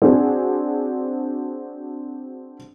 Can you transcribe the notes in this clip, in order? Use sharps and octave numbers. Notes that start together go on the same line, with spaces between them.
C4 D4 F#4 G#4